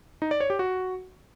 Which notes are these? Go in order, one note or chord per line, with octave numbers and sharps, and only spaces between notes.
D#4
D5
C#5
G4
F#4